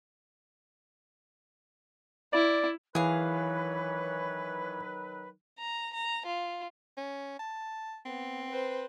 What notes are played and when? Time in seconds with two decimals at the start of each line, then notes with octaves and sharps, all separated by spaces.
2.33 E4 D5
2.95 D#3 E3 F#3 G#4 B4 C#5 F5
5.59 A#5
5.94 A#5
6.26 F4
6.97 C#4
7.39 A5
8.05 B3 C4
8.51 B4 C5